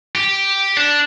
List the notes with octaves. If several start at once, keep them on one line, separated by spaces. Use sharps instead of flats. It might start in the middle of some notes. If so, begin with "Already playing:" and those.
G4
D4